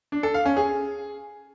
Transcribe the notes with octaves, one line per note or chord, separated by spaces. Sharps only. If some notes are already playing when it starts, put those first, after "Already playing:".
D4
A4
F5
C#4
G#4